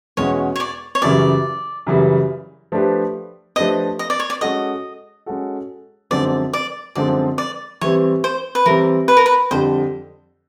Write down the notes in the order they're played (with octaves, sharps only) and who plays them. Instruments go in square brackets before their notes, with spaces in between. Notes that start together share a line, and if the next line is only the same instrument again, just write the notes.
[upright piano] E2 B2 G#3 C#4 F#4 [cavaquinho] C#5
[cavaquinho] C#5
D5
C#5
[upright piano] F#2 C#3 E3 G3 [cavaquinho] D5
[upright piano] F#2 C#3 E3 G3
F3 A3 D4 G4 B4
[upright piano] F3 A3 D4 G4 B4 [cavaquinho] D#5
[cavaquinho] D#5
D5
C#5
D5
[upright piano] G#3 C#4 F#4 A4 [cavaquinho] D#5
[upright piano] G#3 C#4 F#4 A4
[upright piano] F#2 D3 F3 G#3 C4 [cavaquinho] D5
[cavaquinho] D5
[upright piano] F#2 D3 F3 G#3 C4 [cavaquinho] D5
[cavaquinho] D5
[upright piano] E3 G3 C4 [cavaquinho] C#5
[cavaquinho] C5
B4
[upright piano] E3 G3 C4 [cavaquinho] A#4
[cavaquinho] B4
A#4
B4
[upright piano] F2 D3 G3 [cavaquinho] C5